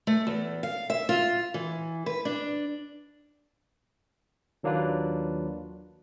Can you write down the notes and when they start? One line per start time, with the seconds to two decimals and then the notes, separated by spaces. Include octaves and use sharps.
0.07 A3
0.27 E2
0.63 F5
0.90 E5
1.09 F4
1.54 E3
2.06 B4
2.25 D4
4.63 D#2 F#3 A#3 D4 F4 B4